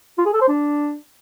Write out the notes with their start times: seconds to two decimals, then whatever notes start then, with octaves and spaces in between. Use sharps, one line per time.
0.18 F4
0.26 G#4
0.33 A4
0.41 C5
0.49 D4